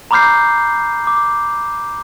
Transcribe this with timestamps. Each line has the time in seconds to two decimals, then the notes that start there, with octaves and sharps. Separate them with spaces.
0.11 A#5 B5 D6 F6 G6 C7
1.07 D6